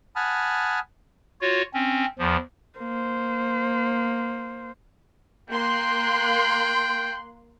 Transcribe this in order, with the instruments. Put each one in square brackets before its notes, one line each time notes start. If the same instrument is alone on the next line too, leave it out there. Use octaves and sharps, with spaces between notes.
[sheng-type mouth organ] F#5 G#5 A5 B5 D#6 F6
[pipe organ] F4 F#4 C#5
C4 C#4
E2 F3
[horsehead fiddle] A#3 C5
[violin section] A#3 C6 F#6 [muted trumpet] G5